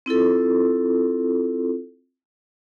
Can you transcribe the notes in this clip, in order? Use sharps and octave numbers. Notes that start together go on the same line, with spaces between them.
C4 E4 F4 A4